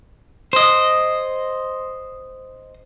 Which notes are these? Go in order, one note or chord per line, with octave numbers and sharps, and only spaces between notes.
C5 D#5